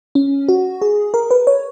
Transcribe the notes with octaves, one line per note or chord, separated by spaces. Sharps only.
C#4
F#4
G#4
A#4
B4
C#5